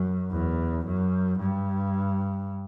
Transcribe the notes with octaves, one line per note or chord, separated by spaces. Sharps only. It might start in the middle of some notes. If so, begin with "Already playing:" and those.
Already playing: F#2
E2
F#2
G2